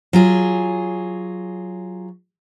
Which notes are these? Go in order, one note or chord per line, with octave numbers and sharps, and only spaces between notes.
F#3 F4 G#4